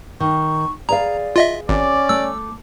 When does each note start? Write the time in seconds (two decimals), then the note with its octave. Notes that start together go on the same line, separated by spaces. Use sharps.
0.20 D#3 C#6
0.89 G#4 B4 D5 F5 A#5
1.36 F4 D#5 E5
1.69 G#1 C#4 D5 D6
2.09 A3 E6